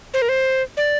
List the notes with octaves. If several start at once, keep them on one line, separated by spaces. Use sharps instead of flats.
C5
A#4
C5
D5